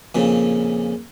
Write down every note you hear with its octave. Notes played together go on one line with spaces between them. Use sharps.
F2 A#2 C#3